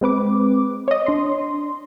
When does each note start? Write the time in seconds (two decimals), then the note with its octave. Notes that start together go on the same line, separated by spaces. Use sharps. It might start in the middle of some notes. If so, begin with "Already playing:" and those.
0.01 G#3 C4 B4 D6
0.88 C#5 D#5
1.06 D4 C6